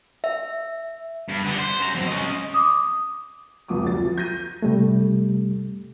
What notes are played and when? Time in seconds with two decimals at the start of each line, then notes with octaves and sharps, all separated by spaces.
0.24 E5
1.29 G2
1.46 D3 B3
1.59 C5
1.80 F#2 A#5
1.95 F#3 C4
2.07 C#4 D#5
2.54 D6 D#6
3.68 F1 C#2 C4 D6 D#6
3.84 D2 F#3 A6
3.95 F3
4.18 G6 A#6 D#7
4.62 C3 G3 A3